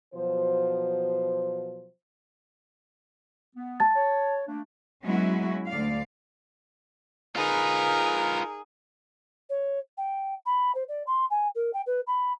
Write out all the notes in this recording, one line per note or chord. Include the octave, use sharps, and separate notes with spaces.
B2 F3 F#3 C5
B3
A5 A6
C#5
A3 A#3 D4
F#3 G#3 B3 C#4 E4 F#4
D2 D5 F5
D#4 F4 G#4 A#4 B4
C#5
G5
B5
C5
D5
C6
G#5
A#4
G5
B4
B5